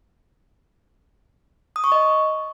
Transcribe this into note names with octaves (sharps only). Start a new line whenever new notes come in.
D#6
C#6
D#5